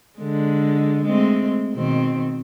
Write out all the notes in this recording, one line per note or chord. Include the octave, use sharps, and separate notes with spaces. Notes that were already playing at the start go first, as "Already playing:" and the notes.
D3 G#3
G#3 A3 C4
B2 D#3 C4